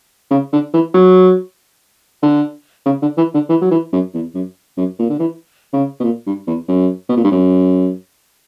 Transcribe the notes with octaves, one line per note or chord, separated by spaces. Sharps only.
C#3
D3
E3
F#3
D3
C#3
D3
E3
D3
E3
F#3
E3
F#2
E2
F#2
F#2
A#2
D3
E3
C#3
B2
A#2
G2
E2
F#2
B2
A#2
G2
F#2